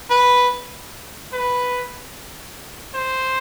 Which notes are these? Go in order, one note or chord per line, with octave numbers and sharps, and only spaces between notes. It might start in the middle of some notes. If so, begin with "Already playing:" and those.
B4
B4
C5